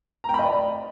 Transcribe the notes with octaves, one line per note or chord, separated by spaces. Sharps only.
A#5
G5
B5
D#5
D5